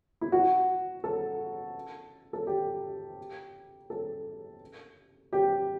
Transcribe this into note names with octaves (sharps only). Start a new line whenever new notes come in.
E4
F#4
A4
A4
G4
A4
G4